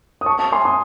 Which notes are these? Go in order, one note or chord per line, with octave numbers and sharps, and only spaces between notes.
D#6
A5 C#6
A5 C#6
G#5 C6
C6 D#6